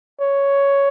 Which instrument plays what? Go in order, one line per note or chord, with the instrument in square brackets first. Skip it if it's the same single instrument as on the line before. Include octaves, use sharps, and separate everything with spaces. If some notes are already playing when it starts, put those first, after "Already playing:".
[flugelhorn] C#5